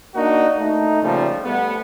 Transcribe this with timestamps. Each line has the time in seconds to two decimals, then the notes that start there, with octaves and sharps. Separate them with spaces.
0.15 A#3 D4 D#4 F#4
0.57 A3 D#4
1.01 A#2 C#3 F3 G3 A3
1.44 G3 A3 B3